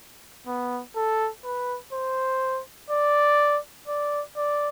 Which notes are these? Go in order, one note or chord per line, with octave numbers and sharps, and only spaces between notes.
B3
A4
B4
C5
D5
D5
D5